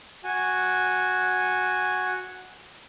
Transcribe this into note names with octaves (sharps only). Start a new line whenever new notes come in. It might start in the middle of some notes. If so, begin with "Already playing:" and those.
F#4 G#5